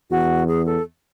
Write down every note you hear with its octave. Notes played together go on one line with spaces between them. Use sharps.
E2 F#4
G#4
A4